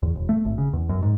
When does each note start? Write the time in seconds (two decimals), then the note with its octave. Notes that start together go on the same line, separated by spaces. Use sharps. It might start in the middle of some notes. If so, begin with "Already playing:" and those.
0.03 E2
0.16 E1
0.29 A3
0.45 G#1
0.58 C#3
0.73 E2
0.89 F#2
1.02 G#2